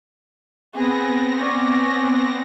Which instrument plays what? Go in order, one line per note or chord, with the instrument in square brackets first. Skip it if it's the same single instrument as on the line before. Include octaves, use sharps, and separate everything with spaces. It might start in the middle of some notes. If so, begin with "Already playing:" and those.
[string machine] B3 C4 A#6 [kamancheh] G#4 B4
[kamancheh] C#4 D5